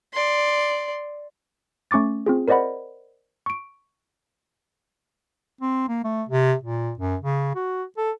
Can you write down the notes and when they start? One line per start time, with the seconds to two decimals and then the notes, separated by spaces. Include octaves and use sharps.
0.12 D5 C6
1.91 A3 C#4 C#6 D6 A6
2.26 C4 F4 G#4
2.48 A#4 C5 D5 D#5 F#5 B5
3.46 C#6 D7
5.61 C4
5.88 A#3
6.04 A3
6.29 C3
6.63 A#2
6.99 F#2
7.21 C#3
7.55 F#4
7.97 A4